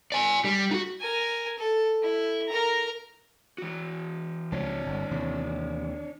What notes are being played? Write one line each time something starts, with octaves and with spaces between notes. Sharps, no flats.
D5 G#5
G3
D#4 F#4
A#4 G#5
A4
E4
A#4 A#5
E3 F#4
C#2 F3 D4 C#5
G1
D#2 C3 E3